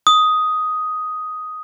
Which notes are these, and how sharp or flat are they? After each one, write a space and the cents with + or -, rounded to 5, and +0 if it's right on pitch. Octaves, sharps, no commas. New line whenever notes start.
D#6 +5